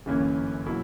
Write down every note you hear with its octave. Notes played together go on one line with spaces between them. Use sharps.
G1 F#2 E3 A#3 C#4
B2 F#3 A#3 E4